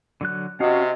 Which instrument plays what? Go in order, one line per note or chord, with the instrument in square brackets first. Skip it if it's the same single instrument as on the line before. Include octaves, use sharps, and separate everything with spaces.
[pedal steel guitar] D3 F#3 F#6
[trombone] C3 [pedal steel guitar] C#4 F5 F#5 [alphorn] F#4 [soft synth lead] D#5